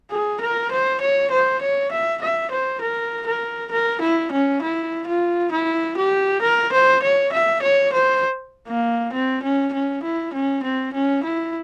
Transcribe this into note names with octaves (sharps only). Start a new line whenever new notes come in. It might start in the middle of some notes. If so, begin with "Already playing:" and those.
G#4
A#4
C5
C#5
C5
C#5
E5
E5
C5
A#4
A#4
A#4
E4
C#4
E4
F4
E4
G4
A#4
C5
C#5
E5
C#5
C5
A#3
C4
C#4
C#4
E4
C#4
C4
C#4
E4